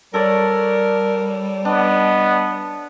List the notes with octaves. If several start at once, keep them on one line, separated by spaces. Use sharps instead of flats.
G3 A4 A#4 C#5 D5
B3 D4 D#5